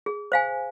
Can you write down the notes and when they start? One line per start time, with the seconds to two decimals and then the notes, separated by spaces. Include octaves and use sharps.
0.06 G#4
0.32 C5 F5 G#5